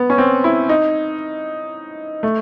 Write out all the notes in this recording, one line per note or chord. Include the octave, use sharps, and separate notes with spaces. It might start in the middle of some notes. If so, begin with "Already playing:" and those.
Already playing: B3
C#4
C4
E4
D#4
A3